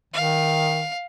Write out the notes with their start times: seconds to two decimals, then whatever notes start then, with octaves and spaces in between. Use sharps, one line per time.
0.14 D#3 F5